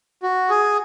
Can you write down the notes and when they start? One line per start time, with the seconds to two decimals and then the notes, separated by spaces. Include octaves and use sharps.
0.23 F#4
0.50 G#4